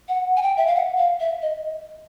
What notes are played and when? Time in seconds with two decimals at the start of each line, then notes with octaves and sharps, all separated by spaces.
0.08 F#5
0.37 G#5
0.42 G5
0.57 E5
0.67 F5
0.75 F#5
0.98 F5
1.20 E5
1.42 D#5